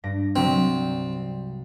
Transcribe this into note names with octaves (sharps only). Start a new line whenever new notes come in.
G2 A#6 D7
C2 C3 F#3 C4